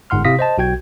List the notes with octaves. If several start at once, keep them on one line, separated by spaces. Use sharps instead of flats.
G1 G#2 F#5 C6 F6
C3 E4 F5 D#6 A#6 B6
C5 D#5 A5
B1 F#4 G5 G#6